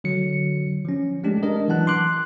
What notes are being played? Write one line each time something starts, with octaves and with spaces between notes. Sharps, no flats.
D3 F#3 C#7
F3 C#4
G#3 A3 C#4 D4 G4
G#3 D4 A#4 D#5
E3 F#3 F#5 A5 F#6
C6 D6 F#6